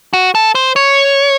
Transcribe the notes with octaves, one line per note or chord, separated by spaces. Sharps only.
F#4
A4
C5
C#5